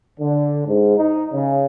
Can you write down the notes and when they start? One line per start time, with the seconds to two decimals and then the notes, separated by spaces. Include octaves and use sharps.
0.19 D3
0.66 G#2
0.97 D#4
1.32 C#3